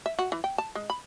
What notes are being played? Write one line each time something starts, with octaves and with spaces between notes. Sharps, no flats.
E5
F#4
E3
G5
A5
G#3
B5